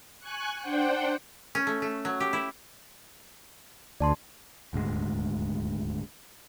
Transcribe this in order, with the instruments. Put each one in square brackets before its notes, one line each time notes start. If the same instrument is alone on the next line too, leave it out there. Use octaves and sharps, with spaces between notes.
[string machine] G#5 C#6 F#6
D4 C5 F#5 G5
[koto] C#4
A3
A3
F#3
G4
E4
[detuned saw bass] D2 [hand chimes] D5 A5 C6
[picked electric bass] D#1 D2 G#2 G#3